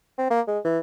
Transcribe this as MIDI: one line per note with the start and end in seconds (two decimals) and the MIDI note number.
0.18 0.30 60
0.31 0.41 58
0.47 0.59 56
0.65 0.79 52